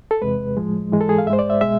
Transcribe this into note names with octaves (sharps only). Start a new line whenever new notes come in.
A4
E2 C3 G#3 B4
A2 F3 G#3
G#2 E3 G#3
A4
G#4
F5
G#2 G#3 C5 E5
D5
E5
B2 G#3 E5